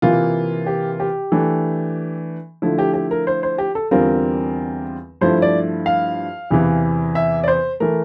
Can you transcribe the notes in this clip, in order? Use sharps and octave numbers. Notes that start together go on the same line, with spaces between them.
C3 E3 A#3 F4
G4
G4
E3 A3 D4
D3 F3 A3 E4
G4
G4
A#4
C5
C5
G4
A4
E2 D3 G3 C4 F4 A#4
G2 F3 A3 E4 C5
D5
F5
E2 C3 E3
E5
D5
C5
E3 A3 A#4